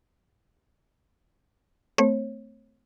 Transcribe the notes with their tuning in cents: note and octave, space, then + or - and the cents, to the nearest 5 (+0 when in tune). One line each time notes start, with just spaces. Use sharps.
A3 +0 C4 -35 C#5 -35